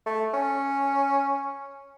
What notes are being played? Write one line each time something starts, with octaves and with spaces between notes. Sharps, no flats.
A3
C#4